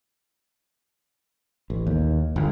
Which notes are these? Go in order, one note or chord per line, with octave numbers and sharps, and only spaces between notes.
A1
D#2
G1